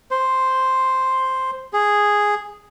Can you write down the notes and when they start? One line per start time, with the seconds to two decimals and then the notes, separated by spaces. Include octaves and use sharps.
0.11 C5
1.73 G#4